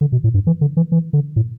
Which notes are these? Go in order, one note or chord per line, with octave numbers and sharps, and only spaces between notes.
D3
B2
A2
G2
E3
D3
E3
E3
D3
A2